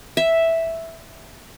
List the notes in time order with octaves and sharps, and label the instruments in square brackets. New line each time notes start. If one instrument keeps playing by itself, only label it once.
[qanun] E5